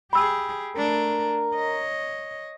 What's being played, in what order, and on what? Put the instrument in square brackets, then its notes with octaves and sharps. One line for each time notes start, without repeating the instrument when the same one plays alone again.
[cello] G4 G#4 [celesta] B5 E6
[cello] A3 D4 [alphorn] A#4
[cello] C#5 D#5